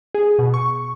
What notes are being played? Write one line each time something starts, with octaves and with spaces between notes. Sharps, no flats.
G#4
B2
C#6